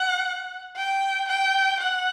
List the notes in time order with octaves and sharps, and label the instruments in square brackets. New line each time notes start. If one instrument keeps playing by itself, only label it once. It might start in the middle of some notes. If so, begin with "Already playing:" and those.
Already playing: [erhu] F#5
G5
G5
F#5